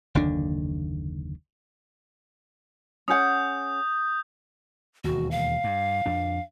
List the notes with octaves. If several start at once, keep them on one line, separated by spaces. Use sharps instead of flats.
F#1 D#2 D3 D4
C#4 G#4 F#5 D#6 G6
E1 D#2 F#4
F5
G2
F2 D4